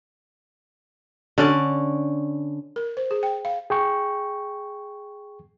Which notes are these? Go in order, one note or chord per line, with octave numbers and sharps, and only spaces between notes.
D3 C#4 D5
A#4
C5
G#4
G5
F5
G#4 G5 C#6